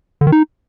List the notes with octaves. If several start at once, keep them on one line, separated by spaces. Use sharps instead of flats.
D3
D#3
D#4